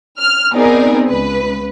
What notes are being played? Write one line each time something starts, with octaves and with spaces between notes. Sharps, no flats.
F6
B3 C4 D#4 G#4 A#4 D5
C#2 B4